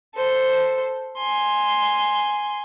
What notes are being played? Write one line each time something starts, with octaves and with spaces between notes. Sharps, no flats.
A4 C5
G#5 C6